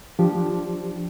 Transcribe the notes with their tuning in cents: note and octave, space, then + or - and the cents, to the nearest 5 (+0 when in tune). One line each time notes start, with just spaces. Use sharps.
F3 +0 D4 +0 G4 +0